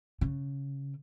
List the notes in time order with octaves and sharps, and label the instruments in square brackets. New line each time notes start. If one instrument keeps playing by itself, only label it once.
[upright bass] C#3